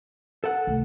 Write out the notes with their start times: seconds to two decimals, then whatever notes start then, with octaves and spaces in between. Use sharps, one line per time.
0.44 A4 F#5
0.67 C2 A3